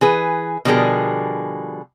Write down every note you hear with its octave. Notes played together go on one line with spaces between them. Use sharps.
E3 G#4 B4
B2 D3 F3 G3 G#4 A#4